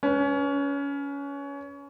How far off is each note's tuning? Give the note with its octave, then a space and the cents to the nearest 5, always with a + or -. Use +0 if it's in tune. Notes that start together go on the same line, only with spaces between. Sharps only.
C#4 +25 B4 +0